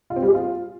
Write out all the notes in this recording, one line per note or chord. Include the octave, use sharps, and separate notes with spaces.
F4
C4
G3
G#4
F4